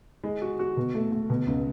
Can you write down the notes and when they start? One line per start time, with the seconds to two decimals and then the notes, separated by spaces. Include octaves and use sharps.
0.24 G#3
0.42 F#4
0.59 F#4
0.77 B2
0.94 A3
1.12 A3
1.30 B2
1.47 C#2